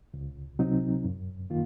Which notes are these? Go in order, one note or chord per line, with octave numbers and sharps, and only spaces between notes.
C#2
C3 F#3 C4 D#4
F#2
D#3 A#3 F4